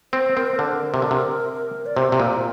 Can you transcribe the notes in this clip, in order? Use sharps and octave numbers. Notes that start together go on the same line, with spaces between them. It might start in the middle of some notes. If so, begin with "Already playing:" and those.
C4 C5
C4 A#4
C5
D3 A#4
C3
D3
C3
D5
C3 C5
C3
A#2